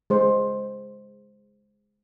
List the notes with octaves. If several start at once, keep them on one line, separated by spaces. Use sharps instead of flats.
G#3 C5